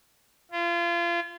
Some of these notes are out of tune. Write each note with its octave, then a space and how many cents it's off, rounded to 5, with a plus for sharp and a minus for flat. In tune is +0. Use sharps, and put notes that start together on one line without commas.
F4 -30